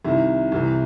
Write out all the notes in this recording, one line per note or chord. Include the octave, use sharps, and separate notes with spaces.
C2 C3 D#3 E4
C2 C3 E3